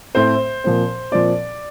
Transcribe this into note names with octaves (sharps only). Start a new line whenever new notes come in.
A2 A3 C4 C5
A#2 F3 C4
A#2 F3 C4 D5